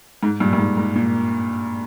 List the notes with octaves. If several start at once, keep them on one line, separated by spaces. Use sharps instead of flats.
G#2
G2 A#2
G2
G#2
G#2
A#2